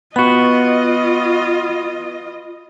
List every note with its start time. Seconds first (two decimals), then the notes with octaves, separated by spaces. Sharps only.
0.16 B3 F4 F#4 D#5 B5